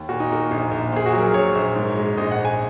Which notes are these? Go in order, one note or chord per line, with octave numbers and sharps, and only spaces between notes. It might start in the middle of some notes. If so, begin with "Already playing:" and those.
Already playing: D#2
A#2 F#4
D#4
A#3 F#4
A#1 D#4
A#1
A#2 G#4
F#4
F#3
A#4
A#1 C#5
A#1
G#2
G#3
A#1 D#5
F#5
A#1
G#5